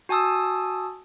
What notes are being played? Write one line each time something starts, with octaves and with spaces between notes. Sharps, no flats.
F#4 G#5 A5 D#6 E6